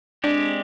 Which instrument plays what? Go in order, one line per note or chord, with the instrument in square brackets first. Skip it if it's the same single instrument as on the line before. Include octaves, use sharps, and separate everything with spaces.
[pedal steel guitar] G#3 C4 G4 [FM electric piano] D4